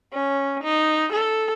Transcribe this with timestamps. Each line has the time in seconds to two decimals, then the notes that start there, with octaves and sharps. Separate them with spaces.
0.13 C#4
0.64 D#4
1.12 A4